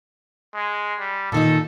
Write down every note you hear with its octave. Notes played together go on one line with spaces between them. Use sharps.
G#3
G3
A#2 D#3 D#4 A4